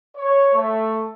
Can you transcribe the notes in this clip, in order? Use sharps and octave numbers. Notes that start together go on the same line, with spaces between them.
C#5
A3